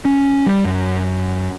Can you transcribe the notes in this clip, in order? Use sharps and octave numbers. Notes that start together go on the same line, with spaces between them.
C#4
G3
F#2